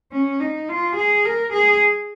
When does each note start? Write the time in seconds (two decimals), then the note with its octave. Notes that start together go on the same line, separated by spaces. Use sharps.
0.12 C#4
0.40 D#4
0.69 F4
0.96 G#4
1.25 A#4
1.53 G#4